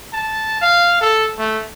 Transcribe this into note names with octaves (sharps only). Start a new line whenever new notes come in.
A5
F5
A4
A3